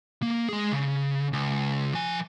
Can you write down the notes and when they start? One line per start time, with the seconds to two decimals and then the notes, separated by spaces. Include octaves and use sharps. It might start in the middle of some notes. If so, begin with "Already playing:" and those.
0.22 A#3
0.49 G#3 G#4
0.72 C#3
1.33 C#2
1.94 F3 G#5